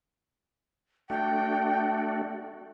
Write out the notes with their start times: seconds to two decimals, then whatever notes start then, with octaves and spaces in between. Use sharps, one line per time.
1.10 A3 D4 F#4 G5